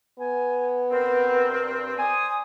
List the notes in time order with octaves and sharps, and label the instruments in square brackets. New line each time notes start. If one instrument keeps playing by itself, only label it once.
[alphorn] B3 [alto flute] G#5
[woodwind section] G2 C4 [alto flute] A#4
[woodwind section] C5 D5 D#6 [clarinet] G#5